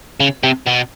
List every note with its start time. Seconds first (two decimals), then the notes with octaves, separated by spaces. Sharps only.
0.20 C#3
0.43 C3
0.66 B2